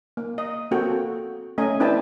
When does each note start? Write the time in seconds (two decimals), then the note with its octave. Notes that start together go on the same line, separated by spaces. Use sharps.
0.17 A#3
0.38 D#5
0.71 A#3 C4 F#4 A4 G5
1.58 A3 C#4 D#5 G#5
1.80 C4 D4 E4 B4 G5 A5